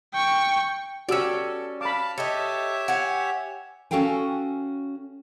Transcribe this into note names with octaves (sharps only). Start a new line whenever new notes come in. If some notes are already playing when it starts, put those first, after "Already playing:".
G5 C#6
C#4 F#4 G4 A4 D5 E6
F5 A5 B5 D6
G4 A4 C#5 D#5 E5
F#5 G#5
C#4 F#4 A4 F5 G5 G#5